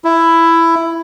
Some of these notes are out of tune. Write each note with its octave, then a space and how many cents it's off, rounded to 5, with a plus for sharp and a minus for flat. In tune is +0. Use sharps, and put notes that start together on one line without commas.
E4 +10